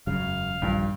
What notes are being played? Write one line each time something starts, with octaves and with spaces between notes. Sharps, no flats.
E1 F#2 C#3 F#3 F5
A#1 G2 D#3 F3